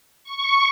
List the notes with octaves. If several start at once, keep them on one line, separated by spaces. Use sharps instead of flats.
C#6